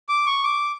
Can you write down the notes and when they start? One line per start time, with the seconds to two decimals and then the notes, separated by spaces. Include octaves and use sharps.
0.09 D6
0.27 C#6
0.44 D6